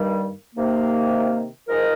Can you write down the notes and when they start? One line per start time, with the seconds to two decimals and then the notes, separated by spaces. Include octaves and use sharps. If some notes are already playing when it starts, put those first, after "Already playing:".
Already playing: G2 D#3 G3 A#3
0.55 C3 D#3 A#3
1.68 G#2 F3 G#3 D#4 A#4